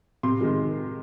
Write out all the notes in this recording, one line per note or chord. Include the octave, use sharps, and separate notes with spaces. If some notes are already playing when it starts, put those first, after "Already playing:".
C3 C6
D#3 G#3